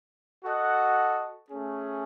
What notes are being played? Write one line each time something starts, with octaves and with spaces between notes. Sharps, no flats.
F#4 A4 D#5 F#5
A3 C#4 G#4